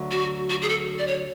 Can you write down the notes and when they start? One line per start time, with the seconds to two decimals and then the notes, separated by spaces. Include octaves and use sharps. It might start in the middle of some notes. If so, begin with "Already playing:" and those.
Already playing: D2 D3 F#3
0.11 F#4
0.50 F#4
0.62 G#4
0.69 A4
0.98 D5
1.07 C#5